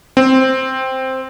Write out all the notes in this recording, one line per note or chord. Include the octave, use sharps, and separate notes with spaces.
C4